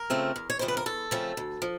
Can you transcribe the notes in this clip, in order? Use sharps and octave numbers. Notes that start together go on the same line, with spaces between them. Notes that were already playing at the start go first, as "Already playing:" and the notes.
Already playing: A#4
C#3 F3 A3 C4
E2
C#5
C#3 F3 A3 C4 C5
B4
A#4
E2 A4
C#3 F3 A3 C4
D2
F3